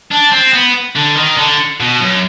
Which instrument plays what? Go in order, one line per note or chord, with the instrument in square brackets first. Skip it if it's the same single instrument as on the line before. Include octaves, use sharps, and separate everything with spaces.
[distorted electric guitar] D4
C4
B3
D3
D#3
D3
B2
F#2